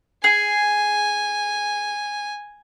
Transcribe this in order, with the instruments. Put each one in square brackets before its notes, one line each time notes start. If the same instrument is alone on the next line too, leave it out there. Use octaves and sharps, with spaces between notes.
[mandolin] G#4 [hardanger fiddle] G#5